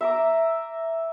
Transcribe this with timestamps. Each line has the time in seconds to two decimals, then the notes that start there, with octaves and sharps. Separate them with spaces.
0.01 E5 A#5 D6